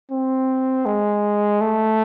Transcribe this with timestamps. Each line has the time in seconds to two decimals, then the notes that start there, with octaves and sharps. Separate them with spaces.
0.11 C4
0.86 G#3
1.61 A3